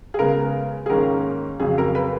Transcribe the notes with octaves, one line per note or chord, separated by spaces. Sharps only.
G#4
C#3 G#3 B3 A#4
G#4
G#2 D#3 A#3 C#4 A#4
F2 C#3 F#3 G#4
A#4
B4